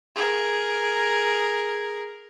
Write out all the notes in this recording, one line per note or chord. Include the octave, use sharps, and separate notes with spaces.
G#4 A#4